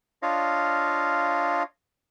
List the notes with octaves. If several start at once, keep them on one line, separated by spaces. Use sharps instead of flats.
D4 F4 C#5 D#5 F5